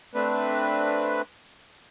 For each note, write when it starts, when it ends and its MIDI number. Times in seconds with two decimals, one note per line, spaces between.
0.14 1.22 57
0.14 1.22 60
0.14 1.22 62
0.14 1.22 71